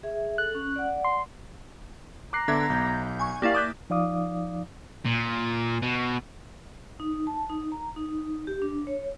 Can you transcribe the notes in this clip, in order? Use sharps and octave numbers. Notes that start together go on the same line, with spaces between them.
G#4 E5
A4 F#6
C#4
D5 F#5
C6
A#5 D6 F#6 C7
D3 B3 E5 D6 G#6
B1 G6
G#5 C#6
A#3 E4 G4 D5 F5
D6 D#6 F#6 G6 A6 B6
F3 D#4 D5 F5 D6 D#6
A#2
B2
D#4
A5
D#4
A#5
D#4
G4
D4
C#5